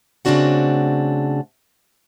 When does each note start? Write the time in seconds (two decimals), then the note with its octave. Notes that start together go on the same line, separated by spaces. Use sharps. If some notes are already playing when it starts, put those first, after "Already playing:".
0.25 C#3 A3 C4 D4 F#4 F#5